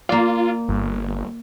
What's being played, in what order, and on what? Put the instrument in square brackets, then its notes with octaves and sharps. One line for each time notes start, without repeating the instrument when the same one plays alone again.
[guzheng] A#3 D5 [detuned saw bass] F4
[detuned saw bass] G1